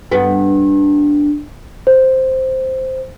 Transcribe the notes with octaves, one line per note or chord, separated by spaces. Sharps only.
G2 B3
C5